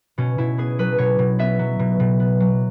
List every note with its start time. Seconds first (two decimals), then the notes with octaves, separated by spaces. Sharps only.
0.18 B2 C#4
0.38 B2 E4
0.58 B3 G#4
0.79 F#3 B4
0.98 B2 C#5
1.19 B2
1.39 B3 E5
1.59 F#3
1.79 B2
2.00 B2
2.20 B3
2.40 F#3